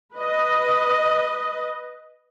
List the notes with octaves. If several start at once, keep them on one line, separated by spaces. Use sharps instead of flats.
B4 D#5